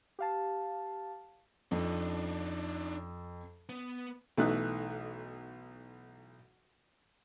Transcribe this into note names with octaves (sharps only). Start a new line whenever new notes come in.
G4 F5 A5
F2 D4 D#4
B3
B1 E3 A3 D#4 F#6